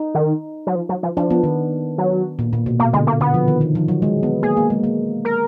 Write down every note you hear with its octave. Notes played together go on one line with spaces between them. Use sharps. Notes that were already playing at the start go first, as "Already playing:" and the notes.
Already playing: D#4
D#3
F#3
F3
F#3
F3
F3 D4
B3
D#3
F#3
A#2
A#2
B2
B2 A#3
D3 G#3
A#3
D3 B3
F3
D#3
D#3
F3
F#3
G#3
B3
A#3 G#4
A#3
G#3
A#3
A#4